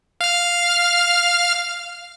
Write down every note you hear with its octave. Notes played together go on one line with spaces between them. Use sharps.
F5 F6